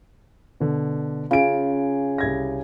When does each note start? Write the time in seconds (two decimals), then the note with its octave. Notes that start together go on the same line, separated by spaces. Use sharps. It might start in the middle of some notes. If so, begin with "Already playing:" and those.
0.60 B2 D3
1.31 C#3 F4 G#4 D7
2.18 C2 G#6 A#6